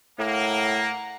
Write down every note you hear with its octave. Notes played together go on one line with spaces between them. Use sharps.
A2 A#3 F#5 A#5